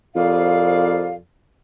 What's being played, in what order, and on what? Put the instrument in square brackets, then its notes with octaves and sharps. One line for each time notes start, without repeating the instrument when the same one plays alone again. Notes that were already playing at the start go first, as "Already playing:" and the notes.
[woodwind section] C2 D5 F5 [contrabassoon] F2